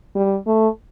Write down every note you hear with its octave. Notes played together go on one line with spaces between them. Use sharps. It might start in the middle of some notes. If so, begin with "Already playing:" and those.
G3
A3